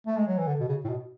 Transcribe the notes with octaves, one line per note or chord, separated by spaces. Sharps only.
A3
G#3
F#3
E3
D3
B2
C#3
A2
B2